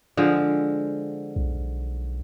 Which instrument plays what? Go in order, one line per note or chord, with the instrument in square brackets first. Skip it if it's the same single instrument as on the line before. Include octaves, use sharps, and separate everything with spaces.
[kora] D3 F3 G#3
[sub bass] B1